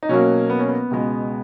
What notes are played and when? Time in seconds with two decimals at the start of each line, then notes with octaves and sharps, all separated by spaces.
0.03 D#4
0.09 B2 F#3 A#3 C#4
0.50 B3
0.59 C#4
0.68 B3
0.91 C#2 B2 G#3 B3